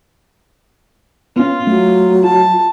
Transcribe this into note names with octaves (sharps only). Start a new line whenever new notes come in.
B3 C#4 F4
F#3 A3
F4 A5